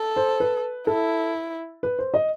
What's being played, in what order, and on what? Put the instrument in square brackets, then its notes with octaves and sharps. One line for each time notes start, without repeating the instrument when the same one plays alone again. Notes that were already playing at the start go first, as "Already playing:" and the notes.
Already playing: [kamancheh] A4
[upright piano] C5
B4
[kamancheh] E4 [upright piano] A4
[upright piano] B4
C5
D#5